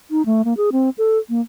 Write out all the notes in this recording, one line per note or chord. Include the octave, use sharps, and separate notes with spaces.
D#4
A3
A#3
G#4
C4
A4
A#3